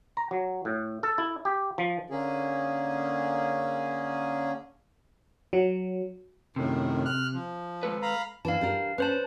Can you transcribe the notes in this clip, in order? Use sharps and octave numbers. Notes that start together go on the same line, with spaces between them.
A#5
F#3
A2
A4
E4
G4
F3
D3 A#3 C#4 G#4
F#3
F#2 A2 C3 D#3
F6 F#6
F3
G#3 A4 B4
F5 A#5 B5
E3 D4 F5 A5
G3 D4 A#4
C#4 B4 C5 A5